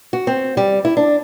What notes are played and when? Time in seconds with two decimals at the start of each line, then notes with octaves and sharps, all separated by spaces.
0.13 F#4
0.27 C4
0.57 G3
0.85 E4
0.97 D4